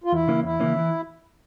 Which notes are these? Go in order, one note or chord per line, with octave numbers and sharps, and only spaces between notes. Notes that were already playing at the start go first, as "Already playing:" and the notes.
F4
E2 E4
C#3 E3 A#3 C#4
E2 E4
C#3 E3 A#3 C#4
E3